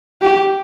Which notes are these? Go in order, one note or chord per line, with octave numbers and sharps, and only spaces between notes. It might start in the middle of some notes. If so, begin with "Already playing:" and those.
G4